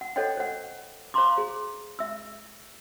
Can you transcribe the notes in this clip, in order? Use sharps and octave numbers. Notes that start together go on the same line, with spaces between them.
F#5
A4 C5 C#5 D#5 F#5 G5
C5 F#5
C5 F5 A#5 C6 D6
G#4
E5 E6